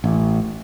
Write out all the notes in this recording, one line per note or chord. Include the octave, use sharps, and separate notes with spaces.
A1